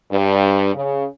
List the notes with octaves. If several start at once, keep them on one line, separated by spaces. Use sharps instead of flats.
G2
C#3